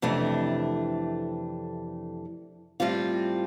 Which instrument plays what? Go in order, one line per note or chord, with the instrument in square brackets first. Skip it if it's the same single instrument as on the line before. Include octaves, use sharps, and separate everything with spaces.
[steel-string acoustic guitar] F2 C3 E3 A3 D4
A2 G3 C4 F4